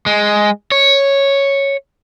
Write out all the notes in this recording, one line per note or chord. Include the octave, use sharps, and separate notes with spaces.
G#3
C#5